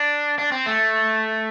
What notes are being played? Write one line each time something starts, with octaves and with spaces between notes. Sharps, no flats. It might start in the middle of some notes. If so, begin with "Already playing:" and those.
Already playing: D4
D4
C4
A3